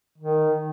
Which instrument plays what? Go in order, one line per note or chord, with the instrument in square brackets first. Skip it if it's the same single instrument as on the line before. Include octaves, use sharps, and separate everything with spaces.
[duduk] D#3